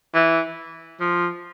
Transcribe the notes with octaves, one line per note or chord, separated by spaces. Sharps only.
E3
F3